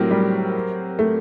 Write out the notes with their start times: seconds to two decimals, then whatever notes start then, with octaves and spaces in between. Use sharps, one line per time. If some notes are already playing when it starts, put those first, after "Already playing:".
Already playing: A2 F#3 C4 G4 A#4
0.11 G3
0.99 A3